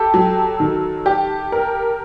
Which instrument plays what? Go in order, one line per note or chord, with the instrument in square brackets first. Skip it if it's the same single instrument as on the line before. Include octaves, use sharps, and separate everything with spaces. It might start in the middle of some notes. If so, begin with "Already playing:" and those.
Already playing: [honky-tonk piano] G4 [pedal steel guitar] A4
[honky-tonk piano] F#3
D#3
G4
A#4